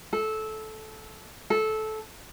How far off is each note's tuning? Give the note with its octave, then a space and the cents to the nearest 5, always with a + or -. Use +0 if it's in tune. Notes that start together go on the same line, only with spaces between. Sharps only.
A4 -15
A4 -15